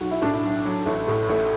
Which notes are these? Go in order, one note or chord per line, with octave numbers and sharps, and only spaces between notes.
B1 F#4
E4
A2 D4
E4
B1
F#3
A1 A3
A2
A1 A3